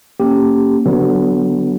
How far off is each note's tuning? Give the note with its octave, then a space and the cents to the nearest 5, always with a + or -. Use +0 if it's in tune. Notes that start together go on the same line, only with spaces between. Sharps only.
A#3 -10 C#4 +0 G4 +0
D3 +0 F#3 +25 B3 +0